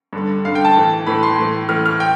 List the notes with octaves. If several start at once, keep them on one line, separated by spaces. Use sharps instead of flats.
G2 D3
G2 D3 F5
G5
A5
A2 E3
A2 E3 B5
C6
A2 E3
A2 E3 F6
F6
G5